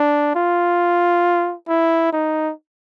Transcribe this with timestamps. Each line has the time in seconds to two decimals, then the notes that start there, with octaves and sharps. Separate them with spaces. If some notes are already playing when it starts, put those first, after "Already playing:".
Already playing: D4
0.35 F4
1.68 E4
2.12 D#4